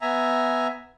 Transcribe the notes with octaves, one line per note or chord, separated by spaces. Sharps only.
B3 E5 G#5 A#5